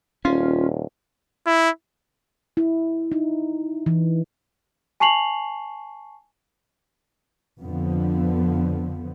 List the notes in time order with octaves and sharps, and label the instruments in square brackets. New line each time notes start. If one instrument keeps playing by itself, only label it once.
[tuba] D#1 [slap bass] C#4 [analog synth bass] F4
[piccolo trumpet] E4
[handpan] E4
D#4
E3
[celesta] G#5 A5 C#6 C7 F7 F#7
[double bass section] F2 D3 F3 B3